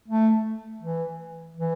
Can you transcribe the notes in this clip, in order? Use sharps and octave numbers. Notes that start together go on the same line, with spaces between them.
A3
E3
E3